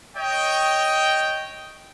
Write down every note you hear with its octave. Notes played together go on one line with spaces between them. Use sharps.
C#5 D#5 G5